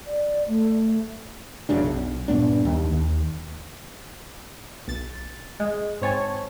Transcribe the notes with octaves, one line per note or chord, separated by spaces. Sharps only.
D5
A3
F1 F#2 C#3 D4
B1
G2 A#2 B3 D4
D#2
D#2
B1 A6
G#3
G#2 C4 C#5 G#5 A5